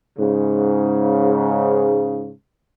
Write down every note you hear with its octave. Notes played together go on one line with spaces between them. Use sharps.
G#2 C#3